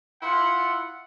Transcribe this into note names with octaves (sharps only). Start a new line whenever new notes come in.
E4 F4 F#5 C6